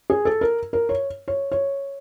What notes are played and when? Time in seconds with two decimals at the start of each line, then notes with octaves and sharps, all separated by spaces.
0.10 G#4
0.25 A4
0.41 A#4
0.73 A#4
0.89 C#5
1.28 C#5
1.52 C#5